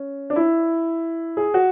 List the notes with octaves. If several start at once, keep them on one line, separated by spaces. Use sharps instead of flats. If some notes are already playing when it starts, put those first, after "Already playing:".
Already playing: C#4
D4
E4
G#4
F#4